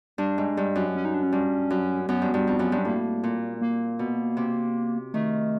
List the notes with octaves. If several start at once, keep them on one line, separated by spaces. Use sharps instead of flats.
G2 D4
G#2
G2
F#2
C#4
D#4
D4
C#4
G2
F#2
F#2 B3
G2
G2
F2
F#2
G2
A2 A#3
A#2
A#3
B2
C3
D#3 A3